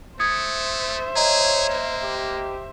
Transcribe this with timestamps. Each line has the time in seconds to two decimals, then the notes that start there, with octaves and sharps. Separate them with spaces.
0.19 A3 C5 E5 D#6 G#6 C#7
1.16 G#4 C#5 D#5 A#5
1.69 A#3
2.04 G4